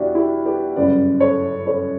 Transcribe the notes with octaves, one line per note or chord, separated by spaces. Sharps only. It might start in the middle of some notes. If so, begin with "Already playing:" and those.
Already playing: E2 B2 D4 E4 F#4 G4
E4 G4
G4 B4
G1 F#2 C#3 B4 D5
A4 C#5
A4 C#5